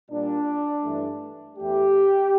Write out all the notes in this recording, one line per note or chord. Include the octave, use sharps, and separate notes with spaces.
A#2 G3 D4
G2 E3 A3
E2 E3 A3 G4